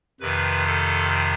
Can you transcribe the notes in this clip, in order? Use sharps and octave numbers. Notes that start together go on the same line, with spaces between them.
F2 C3 D#3 B4
A4